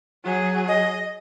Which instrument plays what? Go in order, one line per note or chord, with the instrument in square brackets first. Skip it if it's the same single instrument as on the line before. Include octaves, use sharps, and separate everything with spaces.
[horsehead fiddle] F#3 G#4
[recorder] D#5